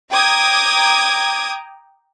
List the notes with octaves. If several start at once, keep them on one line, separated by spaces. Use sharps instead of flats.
G5 A#5 D6 D#6 G#6